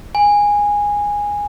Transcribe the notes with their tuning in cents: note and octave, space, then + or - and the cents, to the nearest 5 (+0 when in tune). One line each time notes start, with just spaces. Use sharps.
G#5 -15